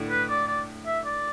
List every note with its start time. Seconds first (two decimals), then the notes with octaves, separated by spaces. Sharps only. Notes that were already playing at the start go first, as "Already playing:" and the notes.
Already playing: A2 D3
0.10 B4
0.29 D5
0.47 D5
0.86 E5
1.05 D5